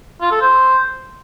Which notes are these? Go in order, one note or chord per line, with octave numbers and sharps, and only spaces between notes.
F4
A4
C5